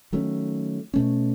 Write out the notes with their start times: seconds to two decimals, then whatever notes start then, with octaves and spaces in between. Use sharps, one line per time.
0.13 D#3 F#3 A3 C#4
0.94 B2 A3 C#4